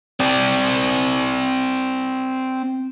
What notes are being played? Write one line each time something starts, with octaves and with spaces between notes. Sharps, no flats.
C4 D5